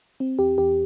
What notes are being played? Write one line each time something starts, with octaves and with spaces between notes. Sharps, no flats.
C4
E2 G4
E2 G4